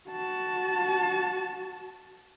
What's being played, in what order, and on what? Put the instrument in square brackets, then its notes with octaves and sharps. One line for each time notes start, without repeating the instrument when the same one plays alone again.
[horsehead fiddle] F#4 A5